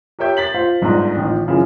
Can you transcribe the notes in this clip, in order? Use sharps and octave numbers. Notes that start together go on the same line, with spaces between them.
G4 A#4 C#5 E5 G5 G6
A6 B6 F#7
F4 C5 F5
G1 G#2 F3 D4 D#5 A#5
A1 D#3 F3
F#2 C#3 E3 F3